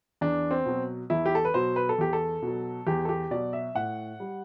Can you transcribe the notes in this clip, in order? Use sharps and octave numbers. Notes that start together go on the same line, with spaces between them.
E2 D4
C4
B2 F#3
E2 E4
G4
A4
B4
B2 F#3 C5
B4
A4
E2 G4
A4
B2
F#3
E2 G4
A4
G4
B2 F#3 D5
E5
A2 F#5
G3